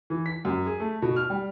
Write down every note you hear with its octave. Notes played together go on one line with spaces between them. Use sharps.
E3
B6
F#2
G#4
A3
B2
F6
G3